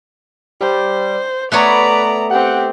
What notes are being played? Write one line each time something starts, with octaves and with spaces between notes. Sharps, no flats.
G3 C5
A3 B3 B4 C#5 D5 A#5
C4 G4 F#5